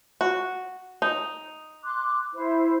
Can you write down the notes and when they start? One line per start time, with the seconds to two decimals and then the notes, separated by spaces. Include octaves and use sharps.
0.21 F#4
1.02 D#4
1.83 C6 D6 F#6
2.33 E4 C5